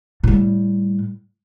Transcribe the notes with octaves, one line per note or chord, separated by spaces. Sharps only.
A2 G3